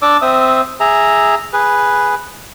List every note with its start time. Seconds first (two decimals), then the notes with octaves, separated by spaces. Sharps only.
0.02 D4 D5 D6 E6
0.22 C4 E5 D#6
0.80 G#4 E5 A#5
1.53 G#4 B4